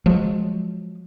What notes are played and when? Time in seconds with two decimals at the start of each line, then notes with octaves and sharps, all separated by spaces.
0.06 F3 F#3 G#3